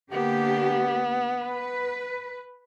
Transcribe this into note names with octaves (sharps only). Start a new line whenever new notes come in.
D3 A#3 B3 G4
B4